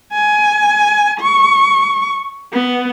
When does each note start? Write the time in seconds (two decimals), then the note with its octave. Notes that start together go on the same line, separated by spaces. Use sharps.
0.13 G#5
1.20 C#6
2.53 B3